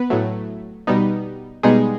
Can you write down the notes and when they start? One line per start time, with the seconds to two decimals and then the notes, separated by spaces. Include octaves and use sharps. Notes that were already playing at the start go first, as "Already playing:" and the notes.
Already playing: B3 B4
0.10 A2 F#3 A3
0.87 B2 G3 B3 D#4
1.63 B2 G3 G#3 B3 D#4 G#4